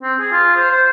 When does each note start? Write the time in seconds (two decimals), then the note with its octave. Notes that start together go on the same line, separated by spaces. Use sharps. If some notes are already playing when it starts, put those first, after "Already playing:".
0.03 C4
0.20 G#4
0.32 F4
0.57 C5
0.70 C5